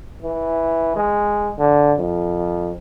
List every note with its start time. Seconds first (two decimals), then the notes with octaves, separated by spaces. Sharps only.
0.22 E3
0.96 G#3
1.59 D3
1.98 F2